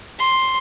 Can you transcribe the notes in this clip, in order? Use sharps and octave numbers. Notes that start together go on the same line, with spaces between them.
C6